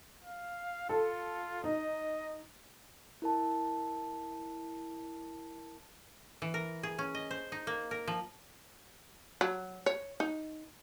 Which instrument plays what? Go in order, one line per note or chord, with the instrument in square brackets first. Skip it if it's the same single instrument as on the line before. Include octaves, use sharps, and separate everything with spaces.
[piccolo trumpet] F5
[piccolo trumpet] F4 [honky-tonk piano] A4
[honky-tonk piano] D#4 [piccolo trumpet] D#5
[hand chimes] E4 A#4 A5
[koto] E3
A#4
G#4
C#4
D#5
C5
D#4
A#3
A#4
F3
[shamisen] F#3
C#5
D#4